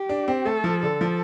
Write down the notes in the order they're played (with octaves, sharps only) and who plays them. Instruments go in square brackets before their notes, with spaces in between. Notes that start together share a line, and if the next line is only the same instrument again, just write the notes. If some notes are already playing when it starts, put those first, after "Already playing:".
Already playing: [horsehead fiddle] G4
[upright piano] D4
C4
[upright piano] A3 [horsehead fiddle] A4
[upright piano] F3
[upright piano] D3 [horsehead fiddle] A4
[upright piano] F3